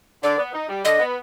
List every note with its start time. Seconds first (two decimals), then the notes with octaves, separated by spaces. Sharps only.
0.23 D3 D5
0.38 B3
0.53 D#4
0.69 G3
0.85 D3 D#5
0.99 B3